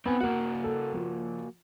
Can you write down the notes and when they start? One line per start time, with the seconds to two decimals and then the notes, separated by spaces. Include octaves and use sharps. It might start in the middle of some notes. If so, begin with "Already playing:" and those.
0.06 B3 C4 G#5
0.21 A#3 F#4 A#4 F#5
0.64 A4
0.94 F3